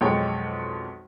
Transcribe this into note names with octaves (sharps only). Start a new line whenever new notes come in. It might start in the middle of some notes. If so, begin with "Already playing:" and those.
B1 F2 G#3 C#5 G5